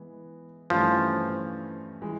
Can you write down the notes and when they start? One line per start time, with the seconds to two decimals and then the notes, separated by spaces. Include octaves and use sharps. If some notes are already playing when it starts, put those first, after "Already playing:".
Already playing: E3 G#3 B3
0.70 G2 E3 F3 A3 C#4
2.02 E3 G#3